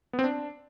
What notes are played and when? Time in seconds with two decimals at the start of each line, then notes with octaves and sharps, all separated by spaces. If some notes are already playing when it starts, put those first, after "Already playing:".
0.13 B3
0.19 C4
0.24 D4